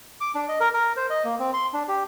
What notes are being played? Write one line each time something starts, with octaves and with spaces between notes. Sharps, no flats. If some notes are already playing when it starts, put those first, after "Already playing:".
D6
D4
D#5
A#4
A#4
C5
D#5
A#3
C4
C6
D4
G4